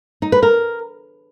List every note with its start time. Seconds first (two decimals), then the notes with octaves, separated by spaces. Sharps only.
0.22 D#4
0.32 B4
0.43 A#4